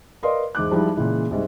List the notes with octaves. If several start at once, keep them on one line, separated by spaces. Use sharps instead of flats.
A#4 B4 D5 D#5 F5 C6
E2 G#2 D6 F#6
F3 G3 G#3 D#4 E4
A#2 C#3 E3 G#3
C2 G#2